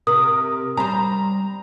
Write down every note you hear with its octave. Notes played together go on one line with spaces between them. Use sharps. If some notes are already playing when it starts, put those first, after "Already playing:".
C3 A#4 D#6
G3 C5 A#5